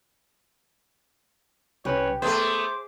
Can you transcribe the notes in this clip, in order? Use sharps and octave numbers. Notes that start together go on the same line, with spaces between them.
C2 C#4 G4 B4 C#5
A3 B3 G#4 C5 E5 D6